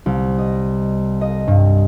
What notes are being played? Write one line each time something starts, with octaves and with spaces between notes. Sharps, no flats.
C2
D#5
D#5
G2